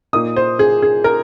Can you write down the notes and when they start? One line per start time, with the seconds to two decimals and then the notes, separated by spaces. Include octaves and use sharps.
0.13 A#2 A#3 D#4 D#6
0.36 C5
0.59 G#4
0.82 G#4
1.04 A#4